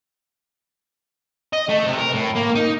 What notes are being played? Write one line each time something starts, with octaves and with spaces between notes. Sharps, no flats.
D#5
A3
C3
A#4
A2
A#3
D#4